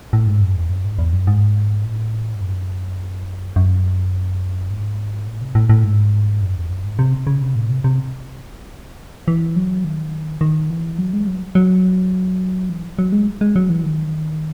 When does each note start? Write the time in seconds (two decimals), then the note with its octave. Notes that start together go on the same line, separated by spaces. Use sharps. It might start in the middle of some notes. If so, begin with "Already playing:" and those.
0.13 A2
0.27 G#2
0.41 F#2
0.56 E2
0.70 F#2
0.85 G#2
0.99 E2
1.13 F#2
1.27 G#2
1.84 A2
2.35 G#2
2.41 F#2
3.56 F#2
4.70 G#2
5.27 A2
5.41 C3
5.55 A2
5.69 A2
5.84 G#2
6.42 F#2
6.56 E2
6.70 F#2
6.84 G#2
6.99 C3
7.27 C#3
7.42 C3
7.55 A2
7.70 C3
7.84 C3
9.28 E3
9.56 F#3
9.84 D#3
10.41 D#3
10.70 E3
10.98 F#3
11.13 G#3
11.27 F#3
11.55 F#3
12.70 E3
12.99 F#3
13.12 G#3
13.41 G#3
13.56 F#3
13.70 E3
13.84 D#3